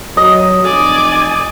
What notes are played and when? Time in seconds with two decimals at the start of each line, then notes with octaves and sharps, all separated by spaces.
0.17 F#3 D#5
0.64 F1 D5 G#5